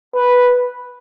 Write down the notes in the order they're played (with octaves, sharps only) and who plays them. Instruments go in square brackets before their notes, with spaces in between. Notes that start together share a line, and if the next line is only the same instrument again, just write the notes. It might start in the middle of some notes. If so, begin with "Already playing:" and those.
[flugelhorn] B4